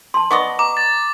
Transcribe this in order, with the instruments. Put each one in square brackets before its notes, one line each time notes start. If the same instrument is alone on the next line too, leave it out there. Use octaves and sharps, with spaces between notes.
[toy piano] A5 C6
[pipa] B3 D5 D#5 [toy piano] C#6
[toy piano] A#5 [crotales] D6
[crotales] A6